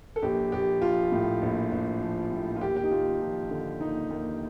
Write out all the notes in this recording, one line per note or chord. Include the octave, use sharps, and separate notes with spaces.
A4
A#1 G4
A#1 G4
F3 F4
A2
A#1
A#1
F3
A2
F4
D#2 G4
G4
D#4
D#2 F4
F3
D3
D#2 D#4
D#2